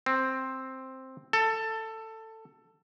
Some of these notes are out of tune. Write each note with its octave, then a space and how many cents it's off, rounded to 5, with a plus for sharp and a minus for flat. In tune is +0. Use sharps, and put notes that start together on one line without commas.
C4 +5
A4 +15